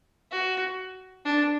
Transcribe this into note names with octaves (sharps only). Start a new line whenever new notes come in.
F#4
D4